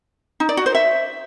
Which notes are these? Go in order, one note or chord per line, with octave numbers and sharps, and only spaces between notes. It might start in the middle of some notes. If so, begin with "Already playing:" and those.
D#4
D5
F#4
C5
E5